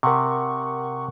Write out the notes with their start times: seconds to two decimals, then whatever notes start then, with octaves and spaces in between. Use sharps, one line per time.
0.03 C3 A#4 F#5 C#6